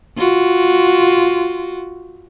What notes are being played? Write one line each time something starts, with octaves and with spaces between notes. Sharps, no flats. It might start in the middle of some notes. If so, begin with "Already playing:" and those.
F4 F#4